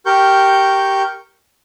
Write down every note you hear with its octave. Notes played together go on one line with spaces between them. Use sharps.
G4 A#4 C#6 G6